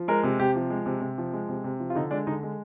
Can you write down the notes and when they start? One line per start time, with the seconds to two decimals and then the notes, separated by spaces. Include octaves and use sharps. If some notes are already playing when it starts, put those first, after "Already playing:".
Already playing: F3
0.08 G#3 A#4
0.24 C3
0.40 C3 G4
0.56 F3
0.70 G#3
0.86 C3
1.01 C3
1.18 F3
1.33 G#3
1.49 C3
1.64 C3
1.80 F3
1.90 F4
1.95 D3 D#4
2.11 G#3 D4
2.27 D3 D#4
2.43 G#3